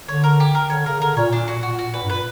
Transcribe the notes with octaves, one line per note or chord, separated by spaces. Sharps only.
D3 C#5
A#4
G4
A#4
D3 C#5
C#3 A#4
D3 A#4
A#2 C#5
A#2 D4
F#4
A#2 F#4
F#4
A#2 B4
G2
A#2 B4